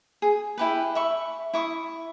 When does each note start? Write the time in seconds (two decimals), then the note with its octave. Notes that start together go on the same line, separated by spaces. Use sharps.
0.22 G#4
0.58 E4 G4 B4
0.95 E5 B5 C#6
1.54 E4 C#6 D#6